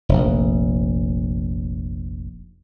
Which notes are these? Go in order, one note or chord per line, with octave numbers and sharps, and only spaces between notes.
F1 A#1